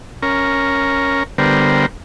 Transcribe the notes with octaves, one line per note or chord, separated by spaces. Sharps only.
C#4 A#4
D3 G3 B3 A#4 C5